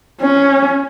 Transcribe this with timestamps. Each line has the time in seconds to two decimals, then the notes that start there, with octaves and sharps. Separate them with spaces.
0.22 C#4